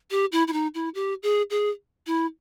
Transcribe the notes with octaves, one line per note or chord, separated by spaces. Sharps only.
G4
E4
E4
D#4
E4
G4
G#4
G#4
E4